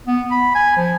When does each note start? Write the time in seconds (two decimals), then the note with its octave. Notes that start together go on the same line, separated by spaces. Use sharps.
0.07 B3
0.31 B5
0.55 G#5
0.77 F3